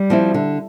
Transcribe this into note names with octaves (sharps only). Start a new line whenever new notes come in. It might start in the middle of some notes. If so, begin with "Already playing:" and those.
Already playing: G3
F3 C4 E4
D3